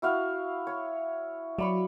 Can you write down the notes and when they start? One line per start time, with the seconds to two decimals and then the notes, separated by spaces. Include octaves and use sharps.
0.02 E4 F#4 F5
0.67 C#5
1.59 F#3 D5 B5 C#6